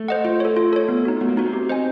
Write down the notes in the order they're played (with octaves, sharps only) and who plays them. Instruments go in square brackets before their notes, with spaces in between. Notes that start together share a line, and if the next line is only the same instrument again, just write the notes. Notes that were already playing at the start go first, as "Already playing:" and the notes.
Already playing: [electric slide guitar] A3
[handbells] C5 D#5 F#5
F4
A4 C#5
F4
A4 C#5
B3
D#4 F#4
[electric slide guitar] A3 [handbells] B3
[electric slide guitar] A#3
[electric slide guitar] B3 [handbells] D#4 F#4
[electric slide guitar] C4
[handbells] G4
C5 D#5 G#5